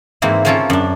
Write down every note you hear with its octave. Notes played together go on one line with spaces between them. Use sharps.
G#2 E3 A#3 C4 E4
A#3 C4 C#4 F4 A4 A#4
F#2 D4